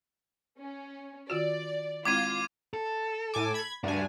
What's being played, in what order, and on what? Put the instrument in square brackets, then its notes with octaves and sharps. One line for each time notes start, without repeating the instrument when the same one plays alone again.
[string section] C#4
[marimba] D#3 F4 F#4 [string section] D5
[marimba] G#3 C4 E4 [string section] F4 [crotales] D6 G#6 D#7
[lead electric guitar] A4
[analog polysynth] A2 G#5 D6
B5 G#6
[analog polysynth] G2 G#5 [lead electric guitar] D4 F#4